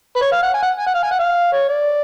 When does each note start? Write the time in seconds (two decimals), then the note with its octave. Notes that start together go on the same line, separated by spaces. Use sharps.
0.16 B4
0.22 C#5
0.32 F5
0.43 F#5
0.54 G#5
0.62 F#5
0.79 G#5
0.87 F#5
0.95 F5
1.03 G#5
1.11 F#5
1.19 F5
1.53 C#5
1.69 D5